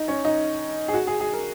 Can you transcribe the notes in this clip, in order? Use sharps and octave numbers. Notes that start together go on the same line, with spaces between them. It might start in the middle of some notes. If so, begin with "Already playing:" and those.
Already playing: D#4
C#4
D#4
G#4
F#4
G#4
G#4
A#4